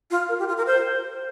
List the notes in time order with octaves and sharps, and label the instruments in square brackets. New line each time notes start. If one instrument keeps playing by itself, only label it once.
[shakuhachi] F4
A#4
G4
F4
A#4
C5